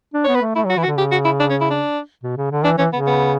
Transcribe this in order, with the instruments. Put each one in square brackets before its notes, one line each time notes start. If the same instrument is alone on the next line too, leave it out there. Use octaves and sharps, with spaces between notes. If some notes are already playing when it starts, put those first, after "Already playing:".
[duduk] D4
[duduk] B3 [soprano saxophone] C#5
[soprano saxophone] B4
[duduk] A3
[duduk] A3 [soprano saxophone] E4
[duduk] F#3
[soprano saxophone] F#4
[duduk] E3 [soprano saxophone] E4
[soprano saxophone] F#4
[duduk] D3
[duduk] C#3 [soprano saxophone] G4
[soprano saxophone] F#4
E4
D4
C#4
E4
D4
[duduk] B2
C#3
D3
[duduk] E3 [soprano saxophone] D4
[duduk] E3 [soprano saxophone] C#4
[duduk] C#3 [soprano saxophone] B3
[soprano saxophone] B3